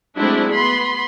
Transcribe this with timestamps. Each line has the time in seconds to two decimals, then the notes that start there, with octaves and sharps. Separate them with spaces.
0.17 F#3 G#3 A3 C4 D4 E4
0.53 B3 B5 C6